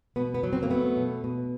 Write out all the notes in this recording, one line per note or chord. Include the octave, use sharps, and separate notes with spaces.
B2 B3
B3
F#3
C4
A#3
A3 B3
B2
B2